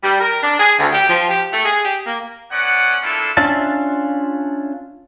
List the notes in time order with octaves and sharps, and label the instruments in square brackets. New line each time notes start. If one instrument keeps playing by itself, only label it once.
[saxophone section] G3
A#4
D4
G#4
D2
G4
F3
G4
A3
G#4
G4
A#3
[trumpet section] B3 C#4 D5 F#5
A3 A#3 D4 E4 F4 A4
[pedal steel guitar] C#4 D4 F4 E5 A5